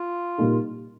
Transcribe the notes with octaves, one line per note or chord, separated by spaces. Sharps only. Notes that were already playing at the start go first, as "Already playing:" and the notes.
Already playing: F4
A#2 G3 A#3 D#4